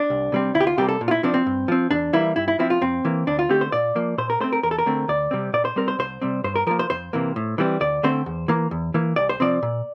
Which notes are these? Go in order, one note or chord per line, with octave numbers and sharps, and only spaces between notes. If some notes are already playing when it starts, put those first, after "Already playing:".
Already playing: D4
C2
C3 G3 C4
D2 E4
G4
F4
C3 G3 A#3 G4
A4
A#2
F4
E4
F3 C4 D4
C4
G2
F3 C4
E2 D4
E3 G3 A#3 E4
G2 E4
E4
F3 C4 E4
F4
F2 C4
E3 A#3
D2 D4
F4
D3 A3 C4 G4
C5
A#2 D5
F3 A#3
A#2 C5
A#4
A3 C4 C5
A#4
E2 A#4
A4
A#4
D3 A3 C4
D2 D5
C3 G3 C4
A#2 D5
C5
G3 C4 A#4
C5
C2 C5
C3 G3 C4
G2 C5
A#4
F3 A#3 A#4
C5
F2 C5
C3 E3 A#3
A2
E3 G3 C4
D2 D5
D3 A3 C4 C5
E2
E3 A#3
E2
E3 A#3
C2 D5
C5
C3 F3 C4 D5
A#2